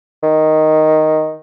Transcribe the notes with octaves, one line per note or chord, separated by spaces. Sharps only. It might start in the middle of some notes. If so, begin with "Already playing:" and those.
D#3